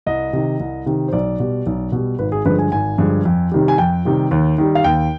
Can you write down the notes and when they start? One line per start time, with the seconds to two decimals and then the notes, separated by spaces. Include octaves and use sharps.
0.06 C2 D#5
0.33 C3 D#3
0.60 C2
0.86 C3 D#3
1.08 C5
1.13 B1 D5
1.39 B2 G3
1.66 B1
1.92 B2 G3
2.19 G#1 B4
2.32 G#4
2.45 G2 D3 F3 G#3 B4
2.59 G#5
2.72 G#1 G#5
2.98 G2 D3 F3 G#3
3.25 F2
3.52 C3 D#3 G3
3.68 G#5
3.78 F2 G5
4.05 C3 D#3 G3
4.31 D#2
4.58 D#3 G3
4.75 F5
4.84 D#2 G5